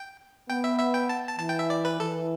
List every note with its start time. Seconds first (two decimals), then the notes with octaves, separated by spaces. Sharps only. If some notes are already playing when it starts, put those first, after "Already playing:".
Already playing: G5
0.50 B3 G5
0.64 E5
0.79 E5
0.94 G5
1.09 A5
1.27 A5
1.39 E3 A5
1.49 G5
1.59 E5
1.70 D5
1.85 B4
2.00 E3 A4